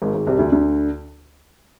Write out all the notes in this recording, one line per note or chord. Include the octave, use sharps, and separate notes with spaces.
G#1 G#2
G#1 G#2
C2 C3
D2 D3
D2 D3